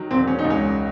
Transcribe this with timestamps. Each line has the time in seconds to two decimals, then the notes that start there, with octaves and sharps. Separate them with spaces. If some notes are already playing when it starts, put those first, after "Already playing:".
Already playing: D#3 F#3
0.10 E1 C4
0.28 C#4
0.39 D#4
0.44 C#2
0.50 C#4